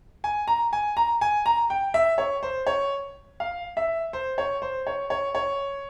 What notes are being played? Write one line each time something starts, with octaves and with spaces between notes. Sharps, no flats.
G#5
A#5
G#5
A#5
G#5
A#5
G5
E5
C#5
C5
C#5
F5
E5
C5
C#5
C5
C#5
C#5
C#5